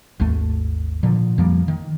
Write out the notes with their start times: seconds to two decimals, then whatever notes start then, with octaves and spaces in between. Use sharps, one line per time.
0.20 G#1 D#2 A3
1.03 A#2 D3 F3
1.38 F2 F3 G3 A#3
1.68 D#3